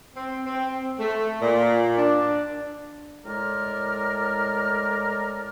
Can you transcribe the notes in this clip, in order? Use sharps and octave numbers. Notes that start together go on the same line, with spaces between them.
C4
C4
A3
A#2
D4
A2 G#3 A#4 D5 F6